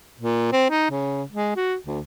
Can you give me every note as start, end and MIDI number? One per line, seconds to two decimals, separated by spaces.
0.20 0.51 46
0.52 0.67 60
0.70 0.88 63
0.90 1.24 49
1.30 1.55 56
1.56 1.76 66
1.86 2.00 38